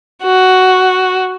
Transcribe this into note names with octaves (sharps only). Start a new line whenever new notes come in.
F#4